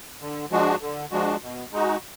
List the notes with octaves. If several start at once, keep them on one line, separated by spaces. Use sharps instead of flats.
D3
F3 G#3 D4 F#4
D3
F3 G#3 D4 F#4
B2
G#3 D#4 F#4